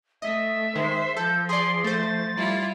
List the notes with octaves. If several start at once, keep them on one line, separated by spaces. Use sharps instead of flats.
A3 D#5 E5
D#3 G#3 C5
F3 A4 G6
G#4 D5 C6
A3 C5 A6
G3 E4 F4